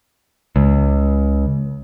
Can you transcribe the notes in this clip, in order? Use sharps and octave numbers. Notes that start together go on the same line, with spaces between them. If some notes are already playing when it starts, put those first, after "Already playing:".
C#2